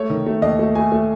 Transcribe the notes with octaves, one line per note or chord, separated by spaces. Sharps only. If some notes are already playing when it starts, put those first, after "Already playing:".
Already playing: A3 C#5
D#3
A3
D#2 D#5
A3
A3 G#5
A3